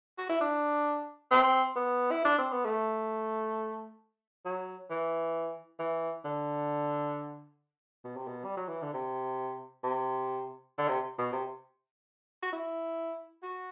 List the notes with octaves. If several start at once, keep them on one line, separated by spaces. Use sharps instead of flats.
F#4
E4
D4
C4
B3
E4
D4
C4
B3
A3
F#3
E3
E3
D3
B2
C3
B2
G3
F#3
E3
D3
C3
C3
D3
C3
B2
C3
F#4
E4
F#4